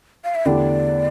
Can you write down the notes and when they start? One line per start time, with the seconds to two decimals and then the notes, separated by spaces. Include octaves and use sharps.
0.24 F5
0.35 E5
0.45 E2 D3 A3 E4 G4 D5